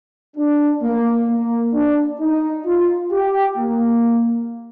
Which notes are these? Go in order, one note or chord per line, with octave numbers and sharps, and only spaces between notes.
D4
A#3
A#3
D4
D#4
F4
G4
A#3